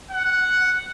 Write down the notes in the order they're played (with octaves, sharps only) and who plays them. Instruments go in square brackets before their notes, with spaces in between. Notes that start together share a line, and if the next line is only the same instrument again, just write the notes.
[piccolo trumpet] F#5